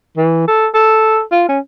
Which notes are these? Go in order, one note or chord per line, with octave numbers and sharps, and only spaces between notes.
E3
A4
A4
F4
C#4